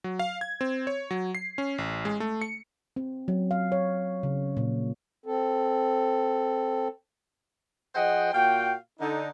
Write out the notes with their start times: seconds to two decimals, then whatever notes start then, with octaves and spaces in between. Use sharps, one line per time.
0.04 F#3
0.19 F5
0.41 G#6
0.61 C4
0.87 C#5
1.11 F#3
1.35 C7
1.58 C#4
1.78 A1
2.05 G#3
2.20 A3
2.42 C#7
2.96 C4
3.28 F#3
3.51 F5
3.72 C#5
4.23 C#3
4.57 A#2
5.26 C4 A4
7.95 F3 G#4 C5 D#5 F#5 G5
8.33 A#2 F#4 F5 G5
8.99 D3 D#4